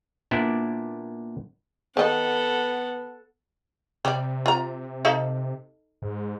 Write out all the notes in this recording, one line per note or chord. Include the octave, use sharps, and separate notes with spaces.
A#2 B3 D4 E4 D5
D#3 B3 A4 D#5 F#5
C3 G3 D5
F4 A#5
D#4 A4 F5
G#2